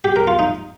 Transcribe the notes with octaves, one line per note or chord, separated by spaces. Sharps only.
G4
A#4
F4
D#4